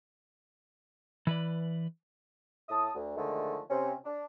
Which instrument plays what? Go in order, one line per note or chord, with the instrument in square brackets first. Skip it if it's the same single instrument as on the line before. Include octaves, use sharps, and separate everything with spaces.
[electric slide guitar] E3 B4 D5
[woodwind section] A2 E5 A5 D#6
D2
D3 D#3 F3 G#3 A3
C3 C4 C#4
D4